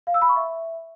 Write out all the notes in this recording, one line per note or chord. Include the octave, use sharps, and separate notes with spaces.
F5
E6
B5
C#6
E5